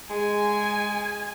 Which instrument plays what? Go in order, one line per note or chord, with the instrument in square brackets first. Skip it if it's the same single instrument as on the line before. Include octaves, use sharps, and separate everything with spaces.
[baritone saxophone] G#3 [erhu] G#5